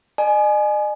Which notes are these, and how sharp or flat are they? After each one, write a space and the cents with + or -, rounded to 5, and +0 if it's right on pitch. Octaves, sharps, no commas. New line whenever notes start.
D#5 -45 G#5 +20